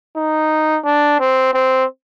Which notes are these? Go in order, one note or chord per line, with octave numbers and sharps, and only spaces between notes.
D#4
D4
C4
C4